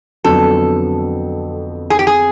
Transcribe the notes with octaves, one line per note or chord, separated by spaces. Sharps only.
F2 D3 F#3 B3 A4
G#4
G4
G#4